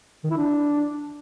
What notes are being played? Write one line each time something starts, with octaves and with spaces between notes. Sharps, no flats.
D#3
E4
D4